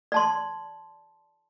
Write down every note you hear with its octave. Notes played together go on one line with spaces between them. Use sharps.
D5 A5 C6